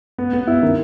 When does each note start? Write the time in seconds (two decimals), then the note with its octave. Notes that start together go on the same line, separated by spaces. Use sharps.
0.18 B3
0.33 B3
0.47 E4
0.63 D#3